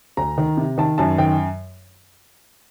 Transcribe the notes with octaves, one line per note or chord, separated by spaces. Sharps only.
D2 A#5
D#3
C3
D#3 A5
F#2 A5
D#3 G5